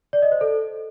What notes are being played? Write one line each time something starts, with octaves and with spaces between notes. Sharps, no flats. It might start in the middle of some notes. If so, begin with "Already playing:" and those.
D5
D#5
C5
A4